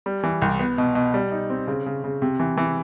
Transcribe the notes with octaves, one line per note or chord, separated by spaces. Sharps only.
G3
E3
C2
B3
B2
B2
G3
D#4
C4
C#3
C#3
C#3
C3
E3
E3